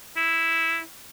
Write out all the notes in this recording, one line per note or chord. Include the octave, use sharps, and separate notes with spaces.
E4